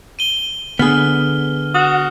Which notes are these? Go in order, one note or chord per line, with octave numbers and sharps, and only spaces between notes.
D#7 G7
D3 B3 G#4 F6
F#4 D#6